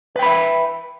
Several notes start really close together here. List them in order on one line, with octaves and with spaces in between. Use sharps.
B4 G5 B5 E5